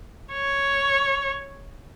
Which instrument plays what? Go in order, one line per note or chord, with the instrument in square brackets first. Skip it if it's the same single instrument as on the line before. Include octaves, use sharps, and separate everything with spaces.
[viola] C#5